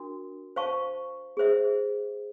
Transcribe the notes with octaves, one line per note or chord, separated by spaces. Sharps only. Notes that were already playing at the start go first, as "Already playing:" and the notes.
Already playing: D4 F#4 A#4
C5 F5 A5 C#6
G#4 C5 E5